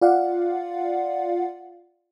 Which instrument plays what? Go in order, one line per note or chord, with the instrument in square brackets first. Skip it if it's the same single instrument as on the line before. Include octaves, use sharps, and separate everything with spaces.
[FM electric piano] F4 D5 F5 F#5